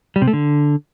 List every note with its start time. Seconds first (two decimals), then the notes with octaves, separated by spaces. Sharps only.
0.16 G3
0.22 C3
0.27 A3
0.33 D3